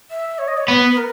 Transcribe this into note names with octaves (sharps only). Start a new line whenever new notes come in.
E5
C#5
D#5
C#5
B3 B4
A#4